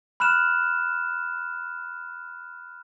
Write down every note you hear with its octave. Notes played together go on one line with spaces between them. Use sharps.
B5 F6 F#6 E7